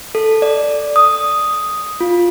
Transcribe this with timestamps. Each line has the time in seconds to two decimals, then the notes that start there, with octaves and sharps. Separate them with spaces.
0.15 A4
0.42 D5
0.96 D#6
2.00 F4